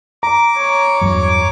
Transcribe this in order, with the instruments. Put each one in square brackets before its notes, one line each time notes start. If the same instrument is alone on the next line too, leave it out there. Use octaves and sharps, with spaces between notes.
[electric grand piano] A#5 [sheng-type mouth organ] D6
[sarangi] C#5
[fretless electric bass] E2 G2 F#3